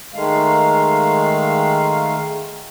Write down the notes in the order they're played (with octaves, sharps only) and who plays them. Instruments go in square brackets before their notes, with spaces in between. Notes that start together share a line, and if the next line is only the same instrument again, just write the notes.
[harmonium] D#3 G#3 A3 F5